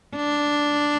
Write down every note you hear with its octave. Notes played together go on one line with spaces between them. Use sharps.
D4